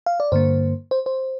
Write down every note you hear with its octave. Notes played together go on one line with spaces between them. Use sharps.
F5
D5
G2 D3 A#3 C5
C5
C5